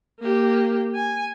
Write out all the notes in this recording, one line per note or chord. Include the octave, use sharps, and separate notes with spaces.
A#3 G4
G#5